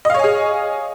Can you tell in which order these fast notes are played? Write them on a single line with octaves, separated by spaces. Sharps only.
D#5 F5 C#5 G#5 G#4